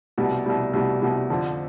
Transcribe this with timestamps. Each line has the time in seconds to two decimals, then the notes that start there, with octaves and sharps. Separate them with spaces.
0.18 C2 B2 G3
0.46 C2 B2 G3
0.73 C2 B2 G3
1.02 C2 B2 G3
1.30 F2 D3 F3